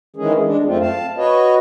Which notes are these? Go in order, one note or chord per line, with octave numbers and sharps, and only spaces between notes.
D#3 E3 G#3 C#4 G#4
G#3 D4
F#2 A3 C4 F4
F5 A5
F#4 B4 C#5 D#5